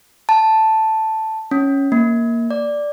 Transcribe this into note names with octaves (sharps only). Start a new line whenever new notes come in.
A5
C#4
A#3
D5